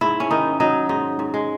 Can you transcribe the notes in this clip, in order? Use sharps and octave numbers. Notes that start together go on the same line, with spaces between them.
G#2 E4
C#4
D#3 D#4
F#3 D#4
G#2 D#4
G#2
G#3